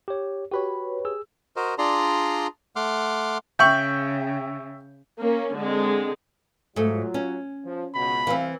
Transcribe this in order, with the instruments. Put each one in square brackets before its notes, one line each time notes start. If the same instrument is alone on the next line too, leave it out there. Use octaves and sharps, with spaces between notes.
[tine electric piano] G4 C#5
[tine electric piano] F#4 B5 [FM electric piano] G4 B4 C#5
[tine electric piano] G#4 E6
[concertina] F#4 A#4 C5 D#5
D4 F4 G#4 D5 A#5 C6
A3 F#5 C6 D6 F6
[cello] C#3 [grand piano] E5 G5 C#6 [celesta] G6 F#7
[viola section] A#3 C#4
D3 G#3 C4
[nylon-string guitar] G#2 A3 [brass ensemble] F#3 F4
[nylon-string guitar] C#4
[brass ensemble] F3
[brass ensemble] C#2 B2 [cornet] B5
[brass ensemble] C2 E5 F5 [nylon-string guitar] E3 C4